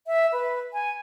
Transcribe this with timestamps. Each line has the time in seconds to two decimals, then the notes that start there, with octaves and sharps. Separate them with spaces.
0.07 E5
0.32 B4
0.73 G#5